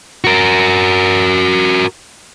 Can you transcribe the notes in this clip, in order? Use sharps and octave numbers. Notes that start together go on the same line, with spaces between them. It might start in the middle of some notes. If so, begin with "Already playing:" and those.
F#4 A#4